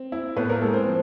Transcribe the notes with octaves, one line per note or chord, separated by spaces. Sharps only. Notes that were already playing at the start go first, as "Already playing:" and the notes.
Already playing: C4
E4
A2 B3 B4
A#3 A#4
G#3 A4
C4 C5
F3